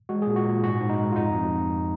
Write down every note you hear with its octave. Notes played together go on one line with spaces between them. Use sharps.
G#3 F#4
A#2 G#4
F#4
A#2
G#2 F#4
G#2
D#4
G#3
F4
F2 D#4
F2